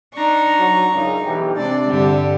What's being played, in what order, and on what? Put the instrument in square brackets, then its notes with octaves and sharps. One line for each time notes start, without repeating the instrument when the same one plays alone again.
[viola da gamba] D4 D#4 [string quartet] A#5 C#6
[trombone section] F#3
[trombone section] C#2 F#2 C#3 [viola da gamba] D#4
[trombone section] B1 E3 G4
[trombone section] C3 D4 [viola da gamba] G#3 C4 D5 [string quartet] A6
[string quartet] G2 G3 G4 [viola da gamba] D3